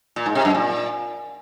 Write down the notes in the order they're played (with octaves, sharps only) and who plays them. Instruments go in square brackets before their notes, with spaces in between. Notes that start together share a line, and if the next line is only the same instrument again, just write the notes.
[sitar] A#2
G#2
C3
F#2
A#2